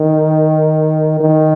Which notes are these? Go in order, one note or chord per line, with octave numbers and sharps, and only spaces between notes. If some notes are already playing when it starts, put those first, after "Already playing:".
Already playing: D#3
D#3